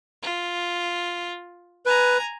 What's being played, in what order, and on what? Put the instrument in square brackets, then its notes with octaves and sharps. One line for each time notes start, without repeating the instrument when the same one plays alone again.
[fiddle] F4
[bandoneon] B4 [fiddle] G#5 A#5